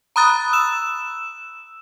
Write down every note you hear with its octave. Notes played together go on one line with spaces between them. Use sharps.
A#5 B5 D#6 F#6 A6
E6 E7